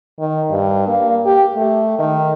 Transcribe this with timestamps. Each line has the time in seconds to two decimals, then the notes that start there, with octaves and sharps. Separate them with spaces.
0.19 D#3
0.50 G2
0.88 A#3
1.25 G4
1.55 A3
1.99 D#3